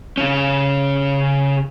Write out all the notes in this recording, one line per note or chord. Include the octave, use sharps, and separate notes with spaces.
C#3 C#4